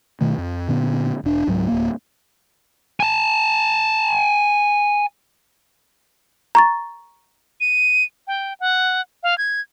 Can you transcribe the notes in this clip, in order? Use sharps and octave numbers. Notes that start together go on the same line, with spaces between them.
B2 D#3 A3
F2
A#2 D3 B3
E1 D4
C#2 G#2 F#3
D1 A#3
G#5 A5
A#5 C#6 A6
D#7
G5
F#5
F5
G#6